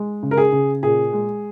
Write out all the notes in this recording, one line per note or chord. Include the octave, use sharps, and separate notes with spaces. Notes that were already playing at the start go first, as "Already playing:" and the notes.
Already playing: G#3
C#3
A#4
G#4
C#3
A#2 G#4
G#3